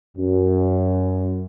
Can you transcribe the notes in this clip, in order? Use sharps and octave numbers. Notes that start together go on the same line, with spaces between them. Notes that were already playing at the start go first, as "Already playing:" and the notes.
F#2